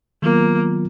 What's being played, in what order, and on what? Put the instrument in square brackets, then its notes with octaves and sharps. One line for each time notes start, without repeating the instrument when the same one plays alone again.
[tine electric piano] D#3 F#3 B3 F4 A#4 [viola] A#3